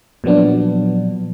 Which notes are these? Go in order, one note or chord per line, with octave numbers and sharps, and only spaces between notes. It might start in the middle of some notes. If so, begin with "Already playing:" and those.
A#2 F3 F#3 B3 D4